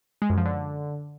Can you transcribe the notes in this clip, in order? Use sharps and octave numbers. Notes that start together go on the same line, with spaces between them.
G#3
F#2
F3
D3